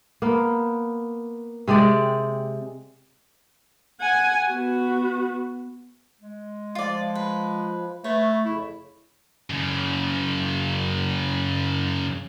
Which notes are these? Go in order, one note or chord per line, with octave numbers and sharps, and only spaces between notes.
A#3 B3
C3 G#3 G4 D5
F#5 G#5
B3 F#4
G#3
F3 F4 D5
B4
A3 B4 C#5 E5
F2 C#3 E4
F#2 C#3